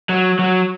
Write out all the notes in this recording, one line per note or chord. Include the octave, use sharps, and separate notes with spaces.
F#3
F#3